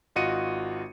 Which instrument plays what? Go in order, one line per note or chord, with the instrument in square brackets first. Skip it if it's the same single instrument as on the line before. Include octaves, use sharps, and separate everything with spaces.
[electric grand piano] G#1 F4 F#4 D#5 C#7 D#7